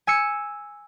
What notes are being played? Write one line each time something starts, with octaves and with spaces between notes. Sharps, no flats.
G#5 E6 G#6 C#7